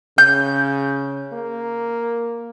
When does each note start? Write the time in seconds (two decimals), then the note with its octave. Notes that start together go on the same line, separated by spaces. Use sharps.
0.18 C#3 G6
1.33 A#3